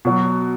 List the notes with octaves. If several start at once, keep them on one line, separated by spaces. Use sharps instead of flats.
B2 F#3